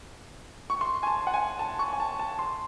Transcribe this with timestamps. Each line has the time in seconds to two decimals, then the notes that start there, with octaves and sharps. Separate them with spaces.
0.70 C#6
0.81 C6
1.03 G#5
1.07 A5
1.27 F#5
1.34 G#5
1.59 A5
1.79 C#6
1.93 G#5
2.00 A5
2.19 A5
2.39 C6